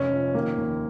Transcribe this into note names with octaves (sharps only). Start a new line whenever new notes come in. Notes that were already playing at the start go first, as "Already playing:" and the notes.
Already playing: F1 C#4
F3
D#3 A#3
D#2